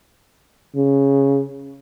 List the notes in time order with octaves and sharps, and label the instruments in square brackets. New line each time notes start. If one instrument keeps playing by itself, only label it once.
[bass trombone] C#3